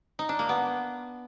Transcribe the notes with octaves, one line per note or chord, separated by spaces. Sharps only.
D#4
D4
A#3
B3